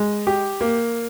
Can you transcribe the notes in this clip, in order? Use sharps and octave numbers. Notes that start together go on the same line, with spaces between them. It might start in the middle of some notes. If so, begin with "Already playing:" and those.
Already playing: G#3
G4
A#3